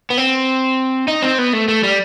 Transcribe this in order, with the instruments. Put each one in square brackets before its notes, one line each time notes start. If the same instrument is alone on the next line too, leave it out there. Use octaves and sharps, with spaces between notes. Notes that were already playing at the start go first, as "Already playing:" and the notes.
[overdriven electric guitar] B3
C4
D#4
C4
B3
A3
A3
G3